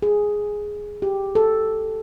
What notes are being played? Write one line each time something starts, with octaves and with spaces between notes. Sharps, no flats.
G#4
G4
A4